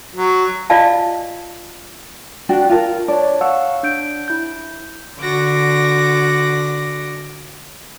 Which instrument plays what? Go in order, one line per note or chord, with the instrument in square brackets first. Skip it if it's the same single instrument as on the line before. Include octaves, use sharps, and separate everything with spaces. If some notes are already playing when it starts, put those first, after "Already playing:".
[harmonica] F#3
[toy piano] F4 D5 D#5 F5 A5
[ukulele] D4 F#4 G5
F4 A#4 A5
[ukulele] D4 D5 [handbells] C#5 A5
[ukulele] C#5 [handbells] F5 F#5 E6
[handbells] D4 G6 D7
E4 G6
[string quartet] D3 F#4 D6 A#6